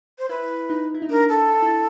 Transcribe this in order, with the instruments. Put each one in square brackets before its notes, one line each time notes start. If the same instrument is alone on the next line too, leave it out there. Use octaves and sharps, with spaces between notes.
[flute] C5
[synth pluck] E4 [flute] B4
[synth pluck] D#4
E4
D#4
[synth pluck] D4 [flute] A#4
[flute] A4
[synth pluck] E4